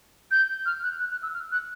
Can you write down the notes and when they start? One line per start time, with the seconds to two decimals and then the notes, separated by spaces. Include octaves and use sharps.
0.31 G6
0.66 F6
0.83 F#6
1.00 F#6
1.12 F#6
1.23 E6
1.34 F6
1.52 F#6